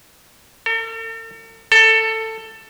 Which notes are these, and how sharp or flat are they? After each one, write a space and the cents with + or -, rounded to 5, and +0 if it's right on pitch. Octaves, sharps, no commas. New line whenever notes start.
A4 +45
A4 +15